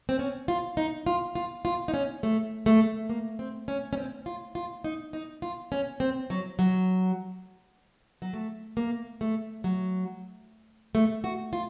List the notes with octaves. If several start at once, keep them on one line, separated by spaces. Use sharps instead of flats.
C4
C#4
F4
D#4
F4
F4
F4
D#4
C#4
A3
A3
A#3
C4
C#4
C#4
C4
F4
F4
D#4
D#4
F4
C#4
C4
F#3
F#3
F#3
A3
A#3
A3
F#3
A3
F#4
F4